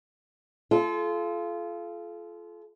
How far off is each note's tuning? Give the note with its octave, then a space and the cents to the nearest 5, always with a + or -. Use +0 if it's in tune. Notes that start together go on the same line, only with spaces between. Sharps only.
F4 -20 A4 -40